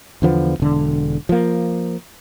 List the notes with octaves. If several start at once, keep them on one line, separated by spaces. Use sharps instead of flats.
E2 D3 F3 B3
E1 D3
F3 A#3